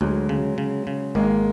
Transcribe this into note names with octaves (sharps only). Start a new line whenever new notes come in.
D2 F#3 G#3
C#3
C#3
C#3
G#1 G#3 A#3